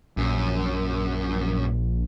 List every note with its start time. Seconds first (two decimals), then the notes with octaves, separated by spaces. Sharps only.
0.17 A#1 F#2